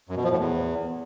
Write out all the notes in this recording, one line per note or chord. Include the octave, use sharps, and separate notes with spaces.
F#2
B2
F3
A2
E2